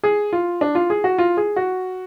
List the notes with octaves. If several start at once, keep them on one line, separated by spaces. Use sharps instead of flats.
G#4
F4
D4
F4
G#4
F#4
F4
G#4
F#4